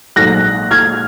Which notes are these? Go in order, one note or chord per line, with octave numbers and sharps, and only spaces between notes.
A#1 G#2 F#3 F#6 A#6
F6 G#6